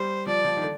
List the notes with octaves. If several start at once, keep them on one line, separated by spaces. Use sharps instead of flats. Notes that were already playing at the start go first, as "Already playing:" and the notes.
Already playing: G3 C5
F3 D5
F3
D#3
D3